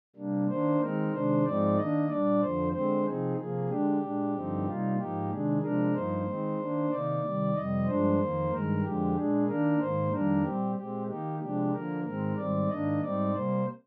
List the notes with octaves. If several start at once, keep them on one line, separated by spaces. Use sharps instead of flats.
C3 G3 A#3 D4
D#3 A#3 D4 C5
D#3 G#3 C4 D#4 A#4
C3 D#3 G#3 D4 C5
G#2 F3 G#3 C4 D#4 D5
D#3 A#3 D4 D#5
A#2 G3 D4 D5
F2 D3 F3 C5
D3 G#3 C4 C5
C3 F3 C4 D#4 G#4
C3 F3 A#3 G#4
D3 G#3 D4 G4
A#2 G#3 D4
G2 D3 F3 C4 D#4
C3 G3 A#3 D#4 F4
G#2 F3 A#3 D#4 G4
C3 D#3 G#3 D4 G#4
C3 F3 G#3 D4 A#4
G2 F3 A#3 D#4 C5
D#3 G#3 C4 D#4
D#3 A#3 D4
C3 D#3 A#3 D#4 D5
C3 D#3 G3
F2 C3 G3 D#5
G2 F3 G#3 D4 C5
F2 D#3 A#3
G2 D#3 G#3 A#4
F2 D3 F3 G#3 G4
A#2 G#3 D4 G#4
D#3 A#3 D4 A#4
G#2 D#3 A#3 C5
F2 D#3 G3 A#3 D4 A#4
A#2 G3 C4 G4
A#2 G#3 C4 G4
D#3 A#3 D#4 G4
C3 F3 G#3 D4 G4
D3 F3 A#3 A#4
G#2 D#3 G#3 C4 A#4
G#2 D#3 G3 C4 D5
G#2 D#3 A#3 D4 D#5
G#2 G3 C4 D#4 D5
C3 G3 A#3 C5